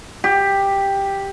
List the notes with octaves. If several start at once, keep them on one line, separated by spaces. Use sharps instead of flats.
G4